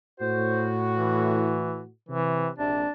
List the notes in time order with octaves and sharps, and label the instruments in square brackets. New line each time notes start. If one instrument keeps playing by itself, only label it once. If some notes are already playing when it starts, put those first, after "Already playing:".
[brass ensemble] A2 F#4 [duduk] C5
[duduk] E3
[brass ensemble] C3 [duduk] E3
[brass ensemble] A#1 C3 [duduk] D4